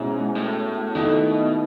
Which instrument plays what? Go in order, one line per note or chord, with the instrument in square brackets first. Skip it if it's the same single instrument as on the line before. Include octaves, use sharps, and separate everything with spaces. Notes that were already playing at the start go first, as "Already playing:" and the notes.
Already playing: [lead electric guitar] G#2 [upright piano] B2 G#3 C#4 E4
[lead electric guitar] A2
[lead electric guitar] B2 [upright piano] D#3 A3 E4